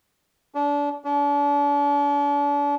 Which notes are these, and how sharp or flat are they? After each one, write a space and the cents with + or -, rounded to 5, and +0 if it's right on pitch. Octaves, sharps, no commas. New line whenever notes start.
D4 -30
D4 -40